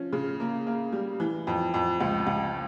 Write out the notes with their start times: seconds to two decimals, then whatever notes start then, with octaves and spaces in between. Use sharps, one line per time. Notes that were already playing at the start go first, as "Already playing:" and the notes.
Already playing: F3 C#4
0.13 C#3
0.40 A#3
0.67 A#3
0.92 G3
1.20 E3
1.47 F2
1.74 F2
2.00 C#2
2.27 C#2